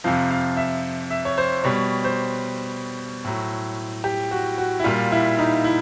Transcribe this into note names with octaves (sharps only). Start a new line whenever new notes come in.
F2 C3 F3 F5
F5
E5
E5
C#5
C5
B2 G3 C#5
C5
A2 F#3
G4
F#4
F#4
E4
A#2 G3 F4
E4
D#4
E4